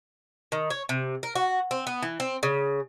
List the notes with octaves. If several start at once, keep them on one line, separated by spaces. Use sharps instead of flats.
D#3
C#5
C3
A#4
F#4
C4
B3
E3
C4
C#3